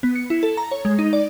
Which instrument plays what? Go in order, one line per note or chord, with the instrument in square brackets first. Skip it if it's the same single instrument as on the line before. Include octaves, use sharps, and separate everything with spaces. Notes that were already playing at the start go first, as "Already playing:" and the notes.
[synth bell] B3
C#7
E4
A4
A#5
C#5
G#3
D#4
D5